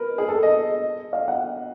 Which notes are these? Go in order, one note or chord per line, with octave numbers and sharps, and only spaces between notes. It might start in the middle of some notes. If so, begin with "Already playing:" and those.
Already playing: A#4 B4
G#4
A4
D#5
F5
F#5